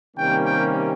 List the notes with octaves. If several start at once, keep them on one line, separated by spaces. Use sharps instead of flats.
C3 D#3 G3 A#3 C#4 G5
G5